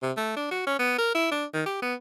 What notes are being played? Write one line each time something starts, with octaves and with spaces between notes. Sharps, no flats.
C3
A3
D4
F#4
C#4
B3
A#4
E4
D4
D#3
G4
B3